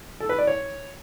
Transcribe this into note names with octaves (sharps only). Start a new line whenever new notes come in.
A4
B4
D5
C#5